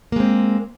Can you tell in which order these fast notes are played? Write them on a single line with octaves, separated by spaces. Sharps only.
A#3 G#3 C4